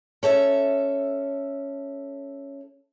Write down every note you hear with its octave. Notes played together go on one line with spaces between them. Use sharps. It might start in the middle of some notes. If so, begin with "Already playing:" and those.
C#4 A4 E5